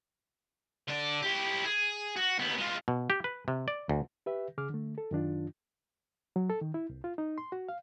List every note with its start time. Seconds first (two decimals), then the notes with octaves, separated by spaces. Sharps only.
0.88 D3 D5
1.22 E4 G4
1.65 G#4
2.16 F#4
2.39 D#2 B3
2.58 G#3 F4
2.88 B2
3.10 G4
3.24 B4
3.48 C3
3.68 D5
3.89 D2
4.26 G4 B4 E5
4.58 C#3 G#4 D6 F6
4.70 D3 A3
4.98 A4
5.11 F#2 D#3 D4 F4
6.36 F#3
6.50 A4
6.61 D#3
6.74 E4
6.90 C2
7.04 F4
7.18 D#4
7.38 C6
7.52 F#4
7.69 F5